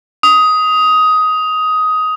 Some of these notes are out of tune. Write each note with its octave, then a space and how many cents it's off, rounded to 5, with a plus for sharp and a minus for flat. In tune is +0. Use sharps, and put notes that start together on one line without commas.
D#6 +15